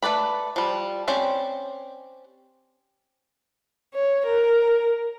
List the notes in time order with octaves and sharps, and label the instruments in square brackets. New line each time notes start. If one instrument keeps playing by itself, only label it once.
[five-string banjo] A3 B4 D5 B5
F3 G3
C4 C#4 G4 C5 D5
[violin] C#5
A#4